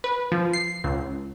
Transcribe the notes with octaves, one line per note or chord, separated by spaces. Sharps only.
B4
F3
C7
C#2